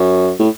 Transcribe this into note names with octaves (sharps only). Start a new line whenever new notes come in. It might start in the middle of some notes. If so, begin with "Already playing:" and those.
Already playing: F#2
A2